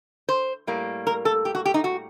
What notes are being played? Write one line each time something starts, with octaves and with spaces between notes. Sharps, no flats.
C5
A2 G3 A#3
A#4
A4
G4
F#4
G4
D#4
F#4